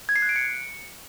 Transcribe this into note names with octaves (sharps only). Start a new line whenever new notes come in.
G#6
C7
F#6
D7
C#7